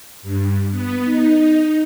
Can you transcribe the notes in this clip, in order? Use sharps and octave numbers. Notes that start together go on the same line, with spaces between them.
G2
B3
D#4